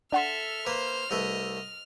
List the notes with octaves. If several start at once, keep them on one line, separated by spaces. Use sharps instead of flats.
D4 A4 E5 F#5 C6 F6
A#3 B4 C5
C2 A3 B4 D#5